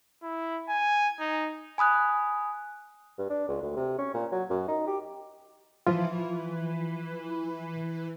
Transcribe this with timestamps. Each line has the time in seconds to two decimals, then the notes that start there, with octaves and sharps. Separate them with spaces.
0.23 E4
0.69 G#5
1.20 D#4
1.78 G#5 B5 D#6 F#6
3.18 G2
3.30 D4
3.48 C#2
3.62 D2
3.76 C3
3.98 C#4
4.14 A#2
4.31 F#3
4.50 F#2
4.68 D#4
4.87 G4
5.87 E3 F3 F4